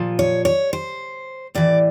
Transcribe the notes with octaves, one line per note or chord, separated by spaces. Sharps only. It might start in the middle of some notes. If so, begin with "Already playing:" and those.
Already playing: A#2 F3
C#5
C#5
C5
A2 E3 D5